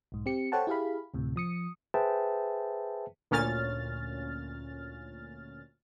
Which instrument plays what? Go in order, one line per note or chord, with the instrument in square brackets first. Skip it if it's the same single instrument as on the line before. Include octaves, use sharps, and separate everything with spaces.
[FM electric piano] B1 G#2
C4 G4 C#7
A4 C5 C#5 F#5 G5 A5
E4 G4 G#4 F5 B5
D2 A2 C3
F3 D#6 C#7
[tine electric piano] G#4 B4 C5 E5 G5 A5
[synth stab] D2 A#2 C#4 F6 A6